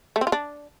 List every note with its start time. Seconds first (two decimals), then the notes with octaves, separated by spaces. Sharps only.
0.16 A3
0.21 C4
0.27 F4
0.32 D4